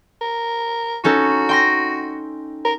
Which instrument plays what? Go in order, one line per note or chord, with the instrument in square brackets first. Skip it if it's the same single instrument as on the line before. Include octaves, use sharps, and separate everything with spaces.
[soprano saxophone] A#4
[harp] C#4 D#4 A4 [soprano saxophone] F#4
[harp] G5 C6 A#6
[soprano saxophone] A#4